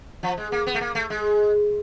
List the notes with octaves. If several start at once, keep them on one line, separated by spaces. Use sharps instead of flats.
F3
G#3
A#3
B3
A3
A#3
A3
G#3